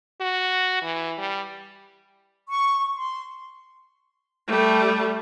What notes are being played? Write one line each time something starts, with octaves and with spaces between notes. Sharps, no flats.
F#4
E3
G3
C#6
C6
G3 A3